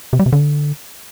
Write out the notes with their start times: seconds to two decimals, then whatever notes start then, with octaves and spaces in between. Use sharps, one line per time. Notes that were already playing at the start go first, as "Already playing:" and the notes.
0.13 C3
0.19 G3
0.26 C3
0.32 D3